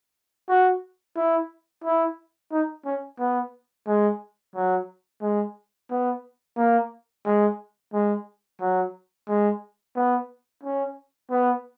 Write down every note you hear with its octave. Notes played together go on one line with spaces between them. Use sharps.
F#4
E4
E4
D#4
C#4
B3
G#3
F#3
G#3
B3
A#3
G#3
G#3
F#3
G#3
B3
C#4
B3